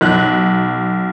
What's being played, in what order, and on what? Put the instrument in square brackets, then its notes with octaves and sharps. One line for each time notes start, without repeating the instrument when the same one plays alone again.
[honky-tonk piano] B1 F#6